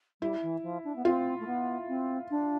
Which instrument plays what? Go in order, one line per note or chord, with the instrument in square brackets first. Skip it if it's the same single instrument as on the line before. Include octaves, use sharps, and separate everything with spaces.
[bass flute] G3 [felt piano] E4
[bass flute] E3
F3
D4
B3
[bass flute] C4 [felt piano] F4
[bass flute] A3
B3
C4
D4